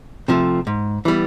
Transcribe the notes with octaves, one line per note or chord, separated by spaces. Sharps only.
C3 F3 A3
G#2
E3 G3 B3